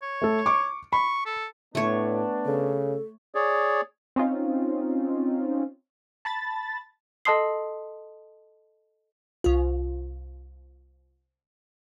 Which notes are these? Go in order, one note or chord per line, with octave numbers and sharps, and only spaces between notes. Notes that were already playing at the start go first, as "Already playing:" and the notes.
C#5
A3 A4
C#6 D6
B5 C#6
A4
A2 A3 B3 D4 C#5
C#3 A4
G#4 C#5 D5
C4 C#4 D#4 F4
A5 B5 A6
A4 D#5 A5 C6 D#6 C7
C2 F4